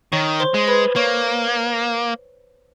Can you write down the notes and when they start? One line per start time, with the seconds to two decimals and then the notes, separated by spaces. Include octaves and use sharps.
0.12 D#3 C#5 C#6
0.40 C5 C6
0.54 G#3
0.68 B4 B5
0.96 A#3 C#5 C#6